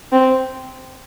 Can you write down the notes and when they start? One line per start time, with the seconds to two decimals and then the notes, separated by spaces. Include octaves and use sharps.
0.12 C4